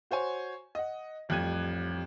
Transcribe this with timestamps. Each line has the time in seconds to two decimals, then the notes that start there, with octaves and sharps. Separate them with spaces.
0.11 F#4 C5 C#5 G#5
0.75 D#5 F#5
1.29 A1 F2 G3 F#6 G#6 D#7